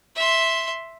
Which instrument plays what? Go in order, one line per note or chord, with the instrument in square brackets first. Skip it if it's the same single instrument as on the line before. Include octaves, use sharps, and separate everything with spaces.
[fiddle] E5 C6